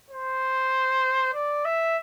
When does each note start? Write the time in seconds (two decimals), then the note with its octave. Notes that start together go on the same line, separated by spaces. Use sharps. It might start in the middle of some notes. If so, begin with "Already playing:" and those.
0.10 C5
1.34 D5
1.65 E5